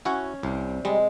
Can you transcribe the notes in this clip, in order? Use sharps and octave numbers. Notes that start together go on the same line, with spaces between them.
C#4 E4 F#4 F#5
C2 C3 G3
G3 G#3